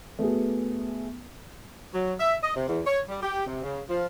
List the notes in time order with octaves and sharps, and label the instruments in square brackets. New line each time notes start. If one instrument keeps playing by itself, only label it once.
[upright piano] A3 B3 F#4 G#4
[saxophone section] F#3
E5
D#5
C3
E2
C#5
G3
G4
C3
C#3
F3